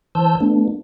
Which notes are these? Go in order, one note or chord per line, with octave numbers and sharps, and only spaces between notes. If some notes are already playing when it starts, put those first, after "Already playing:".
E3 C5 A5 E6 G6
A3 B3 D4